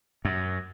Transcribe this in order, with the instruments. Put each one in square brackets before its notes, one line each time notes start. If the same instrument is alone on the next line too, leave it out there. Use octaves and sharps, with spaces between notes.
[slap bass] F#2